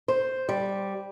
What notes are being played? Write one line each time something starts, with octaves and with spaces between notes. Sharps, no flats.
C5
G3